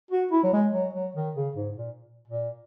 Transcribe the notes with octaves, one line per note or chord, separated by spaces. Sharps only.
F#4
E4
F#3
G#3
F#3
F#3
D#3
C#3
G#2
A#2
A#2